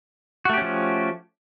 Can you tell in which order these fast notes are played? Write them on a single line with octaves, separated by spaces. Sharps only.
F#4 A3 G4 C#4 F3